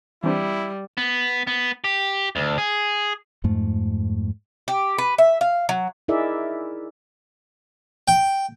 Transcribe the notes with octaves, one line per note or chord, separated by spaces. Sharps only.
E3 G3 C4 D4 E4
B3
B3
G4
D2
G#4
F2 G#2 A3
G4
B4
E5
F5
F#3
D#4 E4 G#4 A#4 D5 E5
G5